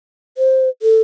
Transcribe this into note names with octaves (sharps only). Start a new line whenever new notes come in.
C5
A4